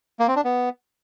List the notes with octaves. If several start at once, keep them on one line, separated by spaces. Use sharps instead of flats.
A#3
C4
D4
B3